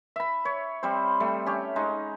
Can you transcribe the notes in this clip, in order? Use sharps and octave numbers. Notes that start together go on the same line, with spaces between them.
E5 B5
C#5
G3 C4 C5
G3 A3
C#4 G4 C#5
G#3 D#4